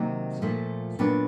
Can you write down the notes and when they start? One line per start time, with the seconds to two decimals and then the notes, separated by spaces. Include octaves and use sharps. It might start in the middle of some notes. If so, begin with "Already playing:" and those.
Already playing: C3 D#3 F#3 A#3
0.42 A#2 F3 A3
0.99 A#2 F#3 B3 D4